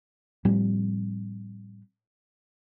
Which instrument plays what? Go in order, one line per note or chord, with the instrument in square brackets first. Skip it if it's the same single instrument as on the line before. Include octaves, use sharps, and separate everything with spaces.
[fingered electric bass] A2 F3 G3 C4